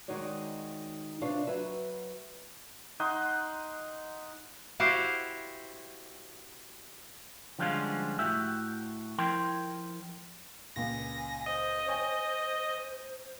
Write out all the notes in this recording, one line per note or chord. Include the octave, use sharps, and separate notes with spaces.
D#3 G#3 D#4 F#4 C#5 D5
C3 D4 F4 B4 C#5 F5
F#3 B4 E5
D#4 D#5 F#5 C6
E4 F#4 G4 C5 F5
D3 F3 G3 G#3 C#4 F4
A2 F#4 G4 E5
F3 E4 A#4 G5 C6
C#2 A#2 G#5 A#6
C5 D#5
C#5 G5 G#5